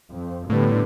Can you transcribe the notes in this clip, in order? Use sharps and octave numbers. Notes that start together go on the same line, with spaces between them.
F2
A2 D3 G3 B3